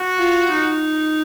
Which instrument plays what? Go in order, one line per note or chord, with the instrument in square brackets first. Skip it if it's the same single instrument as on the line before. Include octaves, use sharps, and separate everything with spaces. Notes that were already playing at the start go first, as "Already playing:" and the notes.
Already playing: [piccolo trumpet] F#4
[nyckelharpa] F4
D#4